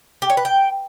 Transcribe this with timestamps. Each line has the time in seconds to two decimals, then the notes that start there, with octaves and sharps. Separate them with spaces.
0.22 G4
0.30 C#5
0.37 B4
0.45 G5